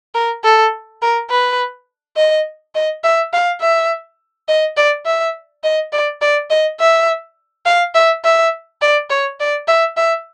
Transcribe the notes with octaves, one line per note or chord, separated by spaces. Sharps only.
A#4
A4
A#4
B4
D#5
D#5
E5
F5
E5
D#5
D5
E5
D#5
D5
D5
D#5
E5
F5
E5
E5
D5
C#5
D5
E5
E5